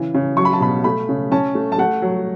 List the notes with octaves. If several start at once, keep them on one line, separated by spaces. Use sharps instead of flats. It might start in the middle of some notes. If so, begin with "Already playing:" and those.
Already playing: C#3 E3
C#3
F#3 C#6
B5
A5
B2 B5
A3 B5
C#3
C#4 A5
A3
A5
A3 F#5
F#3